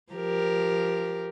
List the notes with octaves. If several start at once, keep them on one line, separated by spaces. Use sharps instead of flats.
F3 G4 A#4